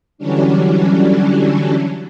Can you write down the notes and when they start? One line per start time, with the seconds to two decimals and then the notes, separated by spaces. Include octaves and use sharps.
0.18 D3 E3 F#3 G3 C#4 D4